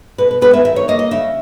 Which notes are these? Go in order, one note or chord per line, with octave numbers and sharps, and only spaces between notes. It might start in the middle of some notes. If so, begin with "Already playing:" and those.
B2 B4
B4
G#3 B3 B4
E5
D#3 E5
C#5
A#3 D#5
D#5
C#3 E5